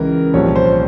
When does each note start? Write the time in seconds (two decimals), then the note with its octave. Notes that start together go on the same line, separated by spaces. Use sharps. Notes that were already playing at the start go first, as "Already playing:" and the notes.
Already playing: C#2 C#3 E3 A#4
0.34 C2 A#2 F3 C#5
0.56 C5